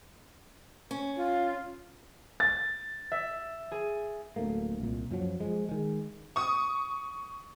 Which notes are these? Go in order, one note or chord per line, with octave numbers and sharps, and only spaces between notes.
C#4
F4
A6
E5
G#4
D1 D2 A3 A#3
C2 A#2
F#2 F3 F#3
F3 G#3
D#3 G#3
C#6 D#6